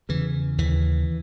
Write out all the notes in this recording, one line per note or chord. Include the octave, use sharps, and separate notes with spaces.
E2 C#3 E3
D#2 C#3 E3